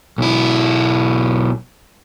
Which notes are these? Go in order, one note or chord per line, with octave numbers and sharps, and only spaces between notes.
B1 E4